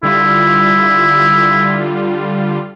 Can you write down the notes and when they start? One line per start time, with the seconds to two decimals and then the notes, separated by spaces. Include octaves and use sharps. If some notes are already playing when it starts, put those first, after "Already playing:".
0.03 D3 G3 E4 F4